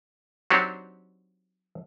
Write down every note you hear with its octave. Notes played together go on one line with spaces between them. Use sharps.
F#3 C4 D4 D#4 F#4 G4